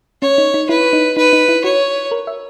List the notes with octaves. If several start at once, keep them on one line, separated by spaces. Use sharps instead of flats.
C#4 C#5
D#4
D#4
E4 B4
D#4
D#4 B4
D#4
E4
F#4 C#5
A#4
E5